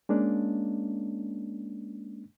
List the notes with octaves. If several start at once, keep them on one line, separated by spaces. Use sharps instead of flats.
G#3 A#3 C#4 D4